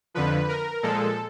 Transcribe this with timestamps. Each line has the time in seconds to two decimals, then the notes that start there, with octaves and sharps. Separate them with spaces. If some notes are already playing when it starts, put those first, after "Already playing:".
0.14 F2 D3 F3 B4
0.48 A#4
0.83 A#2 F3 G#3 A4